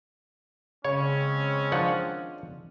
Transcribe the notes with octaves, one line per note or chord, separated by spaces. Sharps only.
C#3 G#3 C4 C#4 C#5
D#3 F3 D4 F#5